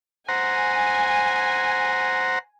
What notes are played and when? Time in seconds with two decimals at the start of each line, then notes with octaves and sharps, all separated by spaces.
0.29 C5 F#5 G#5 A#5